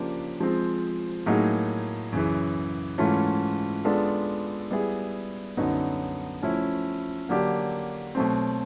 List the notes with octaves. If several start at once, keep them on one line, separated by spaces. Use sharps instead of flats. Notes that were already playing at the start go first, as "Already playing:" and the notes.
Already playing: C#3 F3 A#3 D4 G4
F3 G#3 C4
A2 F#3 A#3 D#4 G#4
F#2 C#3 E3
G#2 E3 A3 C#4 F4
G#3 B3 D4 F4 A4
G3 B3 E4 G#4
F#2 D3 F#3 B3 D#4
F3 A3 C#4 E4
D3 F#3 A#3 D4 G4
B2 F#3 A3 C4